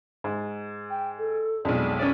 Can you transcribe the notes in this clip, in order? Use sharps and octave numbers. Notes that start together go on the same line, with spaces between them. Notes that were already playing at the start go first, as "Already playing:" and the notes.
G#2
G5
A4
B1 F2 G#3 D5
C#4 C#5 D5